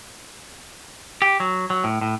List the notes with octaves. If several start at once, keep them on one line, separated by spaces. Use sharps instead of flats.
G4
F#3
F#3
A2
A2